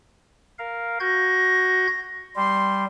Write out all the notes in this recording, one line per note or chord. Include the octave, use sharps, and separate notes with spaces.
A#4 F5
F#4 G6 G#6 A#6
G3 C6